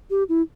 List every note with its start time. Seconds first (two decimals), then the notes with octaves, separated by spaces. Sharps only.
0.10 G4
0.29 E4